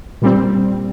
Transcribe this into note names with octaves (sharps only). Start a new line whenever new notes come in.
A#2 G3 C4